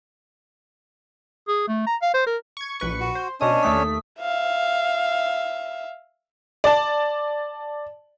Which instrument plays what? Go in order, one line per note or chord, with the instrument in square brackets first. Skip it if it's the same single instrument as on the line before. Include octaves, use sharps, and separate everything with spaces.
[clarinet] G#4
A3
A#5
F5
C5
A#4
[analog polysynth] C#6 G#6
A#1 B4 C#6
[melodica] F#4
[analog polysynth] C5
[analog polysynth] B2 D#6 [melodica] C#4 D4 C#5 [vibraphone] D#5
[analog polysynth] D#2 A3 B6 [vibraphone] D#6
[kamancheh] E5 F5
[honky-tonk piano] D5 A5